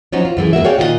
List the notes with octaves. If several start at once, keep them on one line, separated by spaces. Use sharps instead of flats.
F3 F#3 C#4 D#4
F4
F#2 E3 A3 G#4
F2 A#3 F#4 E5
F#4 G#4 C#5 D5 F5 G5
A#2 D#3 F4 A4 D#5 F#5